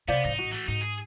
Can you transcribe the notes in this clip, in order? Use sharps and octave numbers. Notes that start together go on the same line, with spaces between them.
C3 B3 C5 D5 F5
A1 G#2 D#4
F#4
E3 A3
G#2 D#4
G#4